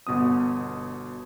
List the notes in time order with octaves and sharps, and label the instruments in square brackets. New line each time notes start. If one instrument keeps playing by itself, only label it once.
[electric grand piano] G1 B2 B3 D#6